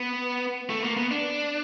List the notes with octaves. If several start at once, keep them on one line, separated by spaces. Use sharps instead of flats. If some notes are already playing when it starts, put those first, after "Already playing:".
Already playing: B3
A3
A#3
B3
D4